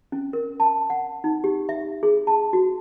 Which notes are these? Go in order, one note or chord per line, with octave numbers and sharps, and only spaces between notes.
C#4
A#4
A5
F#5
D#4
G4
E5
G#4
A5
F#4